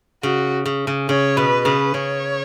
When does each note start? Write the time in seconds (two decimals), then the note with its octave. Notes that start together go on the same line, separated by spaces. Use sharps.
0.23 C#3 F#4
0.66 C#3
0.87 C#3
1.09 C#3 C#5
1.37 B2 B4
1.65 C#3 B4
1.94 C#3 C#5